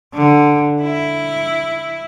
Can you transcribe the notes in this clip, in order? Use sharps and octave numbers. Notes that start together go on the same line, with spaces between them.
D3
E4